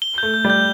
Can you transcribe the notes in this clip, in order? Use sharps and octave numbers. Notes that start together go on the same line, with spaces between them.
G7
A3 G6
G6
G3
G6